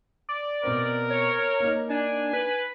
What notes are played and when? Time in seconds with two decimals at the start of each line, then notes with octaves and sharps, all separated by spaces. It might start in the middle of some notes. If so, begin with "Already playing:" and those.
0.29 D5
0.63 B2 C4 A#4
1.10 C#5
1.60 A#3 D#4
1.90 D4 G#5
2.33 B4